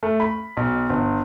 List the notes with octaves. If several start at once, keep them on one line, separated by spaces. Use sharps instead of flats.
A3
B5
B1
G1